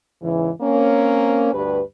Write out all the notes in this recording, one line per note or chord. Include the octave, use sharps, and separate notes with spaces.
E2 G#2 C#3 E3
A#3 C4 C#4
D2 G2 G4 B4